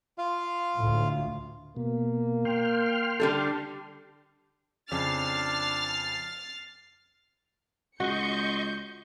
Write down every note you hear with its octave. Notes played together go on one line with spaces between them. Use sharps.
F4 F5
D2 A2
B2 A#3
G5 C6 F6
D3 G3 A4
F2 C#3 D4 F6 A6 C7
C#2 F#4 D#5 C6 C#6 G6 C#7